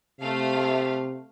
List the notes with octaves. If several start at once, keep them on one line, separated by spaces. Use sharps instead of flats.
C3 A3 F5